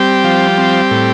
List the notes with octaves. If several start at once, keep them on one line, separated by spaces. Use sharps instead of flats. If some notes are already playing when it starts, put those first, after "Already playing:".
Already playing: G3 C4 G4
F3
C4
A2